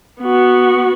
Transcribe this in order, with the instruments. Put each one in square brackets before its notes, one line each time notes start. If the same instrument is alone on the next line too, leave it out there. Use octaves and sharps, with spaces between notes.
[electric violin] B3 F#4